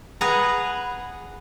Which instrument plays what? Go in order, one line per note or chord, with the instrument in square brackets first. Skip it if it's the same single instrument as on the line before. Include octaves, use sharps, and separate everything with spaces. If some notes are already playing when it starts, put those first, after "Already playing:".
[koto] G#4 B4 F#5 A#5